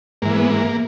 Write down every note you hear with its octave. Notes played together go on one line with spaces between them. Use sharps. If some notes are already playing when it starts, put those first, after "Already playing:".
G#2 E3 A#3
B3
A#3